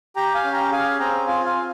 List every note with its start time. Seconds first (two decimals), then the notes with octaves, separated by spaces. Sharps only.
0.16 G4 G5 A#5
0.34 F5 G#5
0.44 C#4
0.53 G5 A#5
0.71 G#4 F5 G#5
0.99 C4 G5 A#5
1.27 F4 F5 G#5
1.46 F5 G#5
1.55 C4